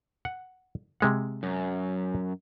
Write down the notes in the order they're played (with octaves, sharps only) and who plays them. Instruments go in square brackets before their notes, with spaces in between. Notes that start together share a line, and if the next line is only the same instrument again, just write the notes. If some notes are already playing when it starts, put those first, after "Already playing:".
[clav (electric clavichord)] F#5
C3 G#3 F#5
[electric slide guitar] F#2